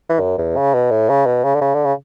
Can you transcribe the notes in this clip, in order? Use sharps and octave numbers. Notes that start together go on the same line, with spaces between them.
E3
F#2
E2
C#3
B2
A2
C#3
B2
C#3
D3
C#3
D3
C#3